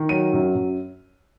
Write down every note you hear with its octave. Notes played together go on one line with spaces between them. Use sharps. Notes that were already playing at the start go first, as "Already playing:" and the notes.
Already playing: D#3
F#3 D#7
F#2
F#2